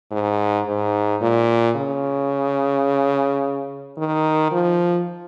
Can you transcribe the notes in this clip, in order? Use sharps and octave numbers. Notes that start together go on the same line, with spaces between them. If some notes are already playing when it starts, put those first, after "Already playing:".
G#2
G#2
A#2
C#3
D#3
F3